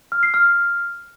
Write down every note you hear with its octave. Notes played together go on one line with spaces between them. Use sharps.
F6
C7
F6